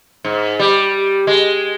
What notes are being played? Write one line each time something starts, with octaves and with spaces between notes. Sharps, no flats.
G#2
G3
G#3